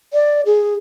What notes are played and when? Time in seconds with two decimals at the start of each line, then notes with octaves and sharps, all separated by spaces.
0.13 D5
0.46 G#4